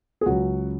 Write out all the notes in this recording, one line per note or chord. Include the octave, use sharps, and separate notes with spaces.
G#4
C#2 C#3 F#3 F#4